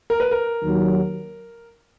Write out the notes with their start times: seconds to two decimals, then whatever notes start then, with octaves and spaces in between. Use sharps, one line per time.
0.10 A#4
0.20 B4
0.31 A#4
0.63 D#2 D#3 F#3